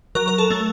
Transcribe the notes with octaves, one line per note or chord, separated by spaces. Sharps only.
F#3 A#4
A#4
A4
A3